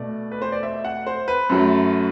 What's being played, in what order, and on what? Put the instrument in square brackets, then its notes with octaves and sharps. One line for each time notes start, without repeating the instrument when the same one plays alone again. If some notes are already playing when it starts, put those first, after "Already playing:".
Already playing: [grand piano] B2 A3 D5
B4
C5
D5
E5
F#5
C5
B4
F#2 F#3 A3